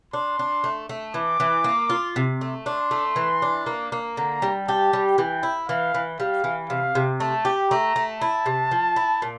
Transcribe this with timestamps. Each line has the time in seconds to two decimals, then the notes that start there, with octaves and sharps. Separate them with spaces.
0.13 D4 C6
0.39 D4
0.64 A3
0.89 A3
1.14 E3 D6
1.40 E3
1.64 A#3
1.90 F4
2.16 C3
2.41 A3
2.66 D4 C6
2.91 A3
3.16 E3
3.42 D4
3.66 A#3
3.92 A#3
4.17 D3 A#5
4.42 G3
4.68 G4 A5
4.93 G3
5.18 E3 G5
5.43 E4
5.69 E3 F5
5.94 E3
6.20 G3 F5
6.44 E3
6.70 C3 F5
6.95 C3
7.20 A3 A5
7.45 G4
7.70 A3 A#5
7.96 A3
8.21 E4 A5
8.46 C3
8.71 F3
8.96 E4
9.22 A#2